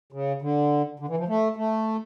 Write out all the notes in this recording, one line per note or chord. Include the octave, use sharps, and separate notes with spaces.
C#3
D3
D3
E3
F3
A3
A3